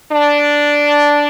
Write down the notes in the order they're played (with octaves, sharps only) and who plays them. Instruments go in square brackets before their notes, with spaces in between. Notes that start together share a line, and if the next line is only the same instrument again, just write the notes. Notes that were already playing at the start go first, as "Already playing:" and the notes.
[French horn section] D4